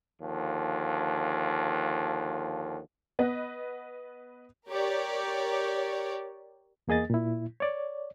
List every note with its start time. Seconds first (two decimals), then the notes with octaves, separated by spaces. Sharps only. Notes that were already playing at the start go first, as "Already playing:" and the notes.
0.21 D#2 D3 F3
3.19 B3 B4 D#5
4.68 G4 A#4 C#5 D5
6.88 E2 A#3 G#4 D#5 A6
7.10 A#2 E4
7.60 C#5 D5